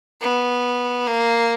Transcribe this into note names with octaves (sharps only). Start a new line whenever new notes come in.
B3
A#3